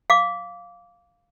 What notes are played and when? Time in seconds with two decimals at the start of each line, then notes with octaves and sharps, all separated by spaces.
0.10 F5 D6